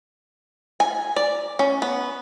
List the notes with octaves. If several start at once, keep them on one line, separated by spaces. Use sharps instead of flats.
G#5
D5
C#4
B3